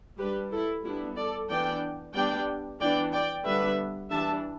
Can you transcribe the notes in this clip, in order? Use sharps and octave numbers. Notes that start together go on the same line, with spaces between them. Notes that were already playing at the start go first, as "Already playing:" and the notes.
G3 D4 G4 B4
E4 A4
G3 B3 D4 E4
A4 D5
E3 B3 D4 D5 G5
G3 B3 D4 D5 G5
E3 B3 D4 D5 G5
D5 G5
D3 G3 B3 D4 B4 E5
E3 G3 D4 E5 A5